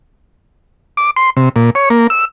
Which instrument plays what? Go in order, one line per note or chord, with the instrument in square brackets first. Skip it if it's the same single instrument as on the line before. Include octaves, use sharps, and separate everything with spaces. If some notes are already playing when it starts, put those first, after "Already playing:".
[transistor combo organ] D6
C6
C3
A#2
C#5
A#3
E6